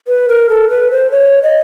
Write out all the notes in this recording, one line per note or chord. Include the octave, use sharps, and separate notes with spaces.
B4
A#4
A4
B4
C5
C#5
D#5